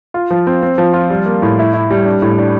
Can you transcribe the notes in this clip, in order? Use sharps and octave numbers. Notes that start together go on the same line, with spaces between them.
F4
F3
C4
C4
F3
F4
G3
A#3
A2
E4
E4
G3
D4
A2
D4